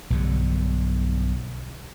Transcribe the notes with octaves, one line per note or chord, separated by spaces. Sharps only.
B1 G2 D3